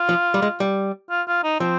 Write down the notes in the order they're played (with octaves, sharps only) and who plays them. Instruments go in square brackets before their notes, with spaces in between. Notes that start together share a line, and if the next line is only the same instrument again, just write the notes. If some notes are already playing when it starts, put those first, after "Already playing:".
Already playing: [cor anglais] F4
[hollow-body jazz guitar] F3
G3
G#3
G3
[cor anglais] F4
F4
D#4
[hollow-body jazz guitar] F3 [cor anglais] C4